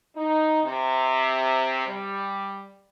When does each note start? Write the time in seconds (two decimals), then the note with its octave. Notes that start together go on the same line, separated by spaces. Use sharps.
0.15 D#4
0.63 C3
1.86 G3